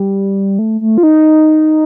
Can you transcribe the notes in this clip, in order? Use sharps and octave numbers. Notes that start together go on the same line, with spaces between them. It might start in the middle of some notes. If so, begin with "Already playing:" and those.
Already playing: G3
A3
A3
F4
D#4